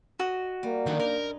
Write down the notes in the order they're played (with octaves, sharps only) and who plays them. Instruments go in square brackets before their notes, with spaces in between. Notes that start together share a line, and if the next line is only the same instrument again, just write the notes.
[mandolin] F#4 [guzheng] D#5
[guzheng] G3 [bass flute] A#3
[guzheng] F#2 D4 B5 [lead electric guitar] D3 D#3
[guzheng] D#4 [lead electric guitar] A#4